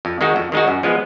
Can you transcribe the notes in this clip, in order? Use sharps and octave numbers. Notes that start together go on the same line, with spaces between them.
F2
D#3 G#3 D#4 F#4
F2
D#3 G#3 D#4 F#4
F#2
F3 G#3 B3